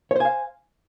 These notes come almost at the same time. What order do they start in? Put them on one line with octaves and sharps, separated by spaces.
C#5 C5 G#5 F5